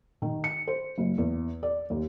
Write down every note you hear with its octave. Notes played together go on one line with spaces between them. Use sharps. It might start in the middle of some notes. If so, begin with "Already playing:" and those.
D#3
C#7
C5
F#1
E2
D5
D#2